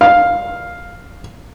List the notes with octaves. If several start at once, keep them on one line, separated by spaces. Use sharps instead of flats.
F5